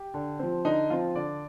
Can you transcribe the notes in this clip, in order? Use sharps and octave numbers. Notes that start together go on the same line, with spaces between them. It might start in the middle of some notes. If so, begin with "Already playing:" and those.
Already playing: G4
D3
F3 C4
D3 D#4
F3 C4 F4
D3 D5